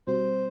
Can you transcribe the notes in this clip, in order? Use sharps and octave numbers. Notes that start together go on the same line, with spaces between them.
B2 G3 C4 F#4 C5